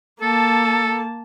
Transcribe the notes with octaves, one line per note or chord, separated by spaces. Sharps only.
A#3 A4 A5